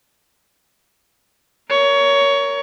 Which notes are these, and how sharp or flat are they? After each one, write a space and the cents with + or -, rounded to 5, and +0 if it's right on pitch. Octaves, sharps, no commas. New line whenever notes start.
A#4 +0 C#5 +20